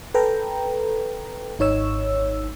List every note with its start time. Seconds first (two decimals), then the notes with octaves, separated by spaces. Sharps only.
0.14 A4 B4 G5 A#5
1.59 G#1 D#4 C#5 E6